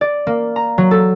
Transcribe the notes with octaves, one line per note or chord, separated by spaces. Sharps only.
D5
A#3
A#5
F#3
A4